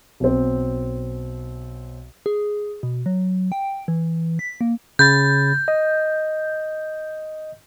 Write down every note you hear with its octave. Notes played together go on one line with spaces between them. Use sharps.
B1 C4
G#4
B2
F#3
G5
E3
B6
A#3
C#3 B5 G6 A6
D#5